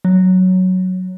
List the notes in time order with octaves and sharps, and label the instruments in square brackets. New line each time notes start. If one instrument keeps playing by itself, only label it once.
[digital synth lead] F#3